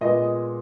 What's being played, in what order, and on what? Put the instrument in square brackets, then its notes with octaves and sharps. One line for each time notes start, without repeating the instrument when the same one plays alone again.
[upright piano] A#2 G#3 B3 D#5